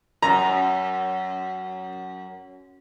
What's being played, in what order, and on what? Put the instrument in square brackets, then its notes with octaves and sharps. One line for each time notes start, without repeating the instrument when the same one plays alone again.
[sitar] F#2 [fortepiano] A#5